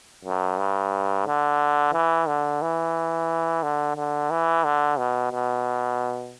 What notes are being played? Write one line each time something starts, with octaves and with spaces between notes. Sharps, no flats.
F#2
G2
D3
E3
D3
E3
D3
D3
E3
D3
B2
B2